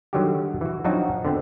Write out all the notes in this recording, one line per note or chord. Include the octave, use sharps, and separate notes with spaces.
D3 D#3 F#3 G3 F#4 G4
E3 F#4
F3 F#3 C4 D4 D#4 F#4
D3 B3 C4